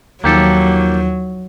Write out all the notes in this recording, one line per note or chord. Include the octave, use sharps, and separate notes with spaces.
D#2 D#3 F3 F#3 A#3 G4 A4